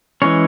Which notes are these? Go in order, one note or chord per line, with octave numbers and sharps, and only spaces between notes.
E3 G#3 C#4 C#5